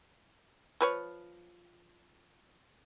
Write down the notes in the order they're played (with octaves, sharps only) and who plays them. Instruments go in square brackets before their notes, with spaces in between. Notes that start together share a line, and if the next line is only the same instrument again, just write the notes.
[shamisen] F3 B4 C#5